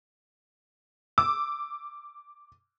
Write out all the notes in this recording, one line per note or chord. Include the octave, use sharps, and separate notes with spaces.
D6 E6